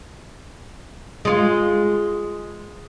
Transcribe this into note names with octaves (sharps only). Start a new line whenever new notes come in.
G#3 F4